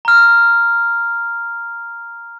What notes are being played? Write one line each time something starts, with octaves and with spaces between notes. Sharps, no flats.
A#5 F6